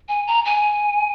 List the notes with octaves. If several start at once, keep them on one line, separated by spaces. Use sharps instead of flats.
G#5
A#5
G#5